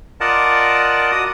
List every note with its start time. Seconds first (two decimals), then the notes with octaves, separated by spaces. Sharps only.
0.21 F4 A#4 D5 D#5 F#5 A5
1.12 F#4 D#6